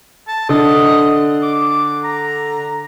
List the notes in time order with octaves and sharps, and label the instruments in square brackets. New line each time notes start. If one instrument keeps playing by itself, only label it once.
[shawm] A5
[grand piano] D3 [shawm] D#5
[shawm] D6
A#5